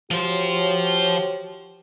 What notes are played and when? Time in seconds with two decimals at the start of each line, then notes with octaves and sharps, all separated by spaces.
0.11 F3 F#4 G4 C5 C#5